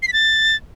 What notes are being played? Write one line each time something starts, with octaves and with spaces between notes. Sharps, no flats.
C7
B6
A6